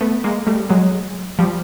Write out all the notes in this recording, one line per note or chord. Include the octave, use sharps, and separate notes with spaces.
A3 B3
G#3 A#3
G3 A3
F#3 G#3
F3 G3